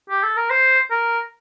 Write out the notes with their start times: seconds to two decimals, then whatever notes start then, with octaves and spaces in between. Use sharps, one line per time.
0.10 G4
0.23 A4
0.36 A#4
0.50 C5
0.90 A#4